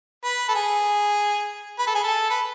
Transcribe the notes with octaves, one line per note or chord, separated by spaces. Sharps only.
B4
A4
G#4
B4
A4
G#4
A4
B4